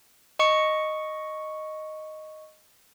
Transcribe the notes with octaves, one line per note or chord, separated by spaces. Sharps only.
D#5 C#6 C#7